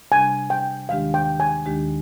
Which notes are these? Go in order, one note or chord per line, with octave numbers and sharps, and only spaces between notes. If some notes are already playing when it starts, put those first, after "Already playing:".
C3 G3 D4 G#5
G5
D#2 D#3 G#3 D4 G4 F5
G5
G#5
D#2 D#3 G#3 D4 G4